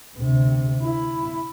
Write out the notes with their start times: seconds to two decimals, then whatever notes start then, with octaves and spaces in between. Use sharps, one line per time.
0.16 D2 C3
0.82 E4